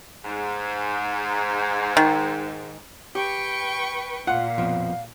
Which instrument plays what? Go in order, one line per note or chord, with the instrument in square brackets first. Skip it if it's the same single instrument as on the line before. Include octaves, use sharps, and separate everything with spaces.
[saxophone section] G#2
[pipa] D#3
[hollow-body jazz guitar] G4 [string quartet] B4 G5 C#6
[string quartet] A#2 [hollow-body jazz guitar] F4 [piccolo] F5 [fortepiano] F#5
[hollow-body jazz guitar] F2 B2 F3